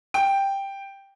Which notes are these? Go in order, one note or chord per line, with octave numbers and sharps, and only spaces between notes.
G5